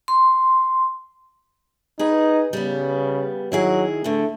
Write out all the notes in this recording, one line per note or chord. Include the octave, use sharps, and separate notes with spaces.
C6
D#4 G#4 B4
C#3 G3 B3
D#3 F#3 E4 G#4
A2 D3 A3